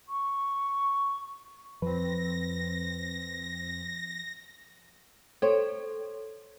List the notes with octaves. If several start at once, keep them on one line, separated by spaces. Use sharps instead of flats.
C#6
F2 F3 C4 B4 A#6
A4 C5 C#5